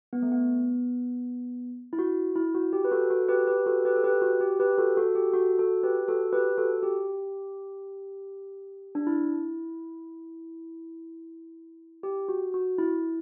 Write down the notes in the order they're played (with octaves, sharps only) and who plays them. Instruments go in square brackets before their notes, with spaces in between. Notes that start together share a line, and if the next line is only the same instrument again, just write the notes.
[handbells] B3
A3
B3
E4
F#4
E4
F#4
G4
B4
F#4 A4
F#4 A4
G4 B4
G4 B4
F#4 A4
G4 B4
A4
G4 B4
F#4
G4
G4 B4
F#4 A4
F#4 A4
G4
F#4 A4
F#4 A4
G4 B4
F#4 A4
G4 B4
F#4 A4
G4
D4
E4
G4
F#4
F#4
E4